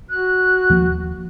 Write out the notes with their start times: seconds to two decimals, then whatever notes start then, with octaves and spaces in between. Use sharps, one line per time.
0.10 F#4 F#6
0.70 D#2 F3 A#3